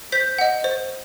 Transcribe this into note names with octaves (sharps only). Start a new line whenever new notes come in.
C5 G6 B6
D#5 F#5
C5